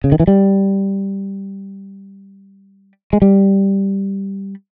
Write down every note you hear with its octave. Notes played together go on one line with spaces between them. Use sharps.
C#3
D#3
E3
G3
G#3
G3